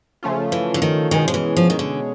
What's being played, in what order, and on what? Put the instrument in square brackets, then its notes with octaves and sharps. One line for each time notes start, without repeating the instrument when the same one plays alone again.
[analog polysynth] C#3 F3 A3 C#4 F4
[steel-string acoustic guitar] E3
D3
D#3
[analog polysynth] B2 G#3 C#4 [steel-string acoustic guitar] D#3
[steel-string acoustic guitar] F3
E3
F3
D#3
D3